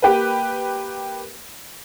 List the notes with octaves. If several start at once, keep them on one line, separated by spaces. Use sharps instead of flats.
A#3 G4 B4